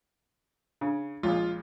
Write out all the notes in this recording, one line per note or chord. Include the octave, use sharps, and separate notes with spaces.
C#3 D4
C#2 A#2 F3 G#3 F4